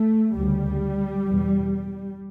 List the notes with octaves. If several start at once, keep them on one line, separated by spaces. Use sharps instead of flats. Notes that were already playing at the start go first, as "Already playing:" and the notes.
Already playing: A3
D2 C#3 G3
E2 B2